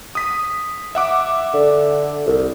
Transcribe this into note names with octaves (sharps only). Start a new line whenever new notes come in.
D#6 B6
E5 F#5 D6
D3
C2